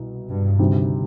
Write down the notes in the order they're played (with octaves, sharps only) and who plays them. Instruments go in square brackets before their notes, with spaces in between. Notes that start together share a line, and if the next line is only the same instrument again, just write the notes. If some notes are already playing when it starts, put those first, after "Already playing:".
Already playing: [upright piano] C2 B2
[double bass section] G2
[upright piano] D2 C3 D#3 G3